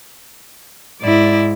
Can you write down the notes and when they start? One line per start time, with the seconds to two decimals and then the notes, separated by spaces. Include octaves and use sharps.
1.01 G#2 E4 D5